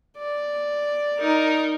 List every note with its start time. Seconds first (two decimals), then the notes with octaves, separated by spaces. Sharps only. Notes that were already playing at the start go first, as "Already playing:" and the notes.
0.17 D5
1.19 D#4 A#4